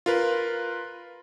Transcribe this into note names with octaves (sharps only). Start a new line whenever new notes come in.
F4 A#4 B4